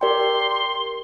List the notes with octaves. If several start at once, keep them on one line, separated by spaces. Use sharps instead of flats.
G4 A#4 D5 G5 C6